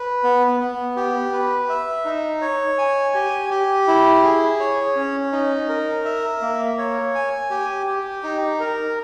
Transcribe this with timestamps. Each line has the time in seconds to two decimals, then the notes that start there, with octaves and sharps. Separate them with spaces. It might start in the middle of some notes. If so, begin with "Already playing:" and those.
Already playing: B4
0.24 B3
0.60 B3
0.96 G4
1.33 B4
1.69 E5
2.05 D#4
2.42 C#5
2.78 G#5
3.14 G4
3.51 G4
3.87 E4
4.23 G#4
4.60 C#5
4.96 C#4
5.32 D#4
5.69 A#4
6.05 E5
6.42 A#3
6.78 C#5
7.15 G#5
7.51 G4
7.87 G4
8.23 D#4
8.60 A#4